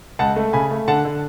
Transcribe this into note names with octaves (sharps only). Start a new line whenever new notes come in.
C#2 F#5 A5
A3
C#3 G#5 B5
A3
D3 F#5 A5
D3